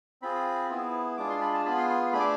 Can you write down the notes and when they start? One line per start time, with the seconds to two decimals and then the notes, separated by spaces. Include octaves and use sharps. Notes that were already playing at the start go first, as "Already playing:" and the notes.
0.22 C4 F4 G#4 B5
0.69 B3 E4 G#4
1.17 G#3 D4 F4 G#4 D6
1.30 C6
1.41 B5
1.54 A5
1.65 B3 F4 G#4 B5
1.77 C6
1.90 C6
2.13 A3 D4 G#4 B5
2.20 D6